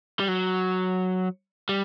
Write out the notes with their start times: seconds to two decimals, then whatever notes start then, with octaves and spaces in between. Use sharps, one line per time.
0.20 G3
0.28 F#3
1.69 G3